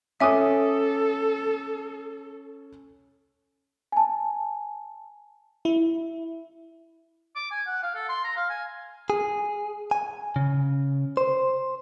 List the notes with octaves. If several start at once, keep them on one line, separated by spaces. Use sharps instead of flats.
C#4 A4 E5 G#5 D6 D#6
G#5 A5
E4
D6
G#5
F#5
F5
A4
C6
A#5
F5
G#5
G#4
G#5
C#3
C5